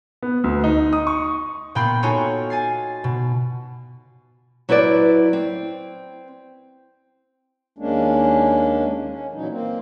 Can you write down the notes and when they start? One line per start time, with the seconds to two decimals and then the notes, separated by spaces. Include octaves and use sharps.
0.23 B3
0.44 D2
0.64 D#4
0.93 D#6
1.07 C#6
1.75 A#2 B3 F4 G5 B5 C7
2.03 D#4 F4 F#4 A4 C#5 G#5
2.50 G#5 A6 C7
3.04 B2
4.69 F#3 E4 B4 C5 D5
5.33 C4
7.78 D#2 G#3 A#3 C#4 D4
9.06 C#4
9.33 A#2 E3 F#3 D#4
9.49 A#3 C4